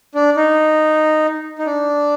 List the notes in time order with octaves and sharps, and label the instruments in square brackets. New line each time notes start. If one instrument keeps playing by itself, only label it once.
[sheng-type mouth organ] D4
D#4
D#4
D4